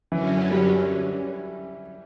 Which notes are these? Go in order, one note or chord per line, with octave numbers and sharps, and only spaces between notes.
F#2 D3 E3 F#3 C#4
G3